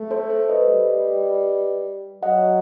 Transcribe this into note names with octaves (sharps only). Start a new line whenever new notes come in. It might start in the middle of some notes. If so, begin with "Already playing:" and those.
Already playing: A3
A4 C5
A4 C5
B4 D#5
G3
F#3 D#5 F#5